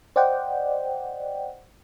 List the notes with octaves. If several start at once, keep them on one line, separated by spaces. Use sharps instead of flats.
C5 D5 D#5 F#5 G5